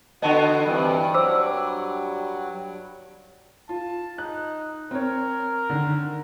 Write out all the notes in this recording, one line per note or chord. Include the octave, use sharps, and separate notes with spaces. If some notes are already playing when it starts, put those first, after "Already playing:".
D3 B3 F#4 D#5 A5
G2 C3 E3
F#3 C5 D6 E6
F4 A5
D#4 F#6
C4 A#4 C#5
D3 D#3